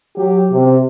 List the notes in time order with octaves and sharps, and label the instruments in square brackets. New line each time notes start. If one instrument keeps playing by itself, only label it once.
[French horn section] F#3 G4
C3